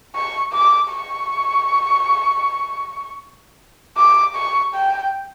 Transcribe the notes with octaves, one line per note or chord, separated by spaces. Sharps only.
C#6
D6
C#6
D6
C#6
G5